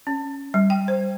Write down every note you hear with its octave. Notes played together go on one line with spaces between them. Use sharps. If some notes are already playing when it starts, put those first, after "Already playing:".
C#4
G3
G5
C5